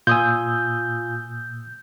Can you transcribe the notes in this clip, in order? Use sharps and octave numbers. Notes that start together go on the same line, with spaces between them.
A#2 F4 G#5 D#6 E6 G6